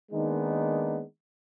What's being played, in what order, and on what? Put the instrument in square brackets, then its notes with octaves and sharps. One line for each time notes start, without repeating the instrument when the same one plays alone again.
[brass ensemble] D#3 G#3 A#3 B3 D4 D#4